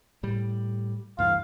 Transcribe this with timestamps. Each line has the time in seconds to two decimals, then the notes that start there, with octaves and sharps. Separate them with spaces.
0.23 A2 G3
1.19 D2 G2 E3 F5